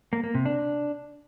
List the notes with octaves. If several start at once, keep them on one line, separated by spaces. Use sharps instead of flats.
A#3
A#3
C3
D4